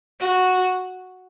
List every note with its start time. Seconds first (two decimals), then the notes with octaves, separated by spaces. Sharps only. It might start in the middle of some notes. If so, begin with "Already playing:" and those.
0.20 F#4